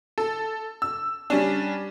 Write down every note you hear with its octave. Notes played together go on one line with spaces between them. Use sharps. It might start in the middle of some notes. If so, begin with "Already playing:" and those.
A4
E6
G3 C#4 D4